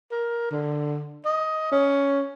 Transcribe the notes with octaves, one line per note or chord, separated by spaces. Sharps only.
A#4
D3
D#5
C#4